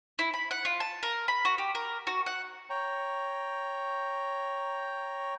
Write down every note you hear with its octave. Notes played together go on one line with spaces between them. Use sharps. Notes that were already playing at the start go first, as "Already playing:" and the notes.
E4
B5
F#5
F4
A5
A#4
B5
F#4
G4
A#4
F#4
F#5
C#5 G5 A#5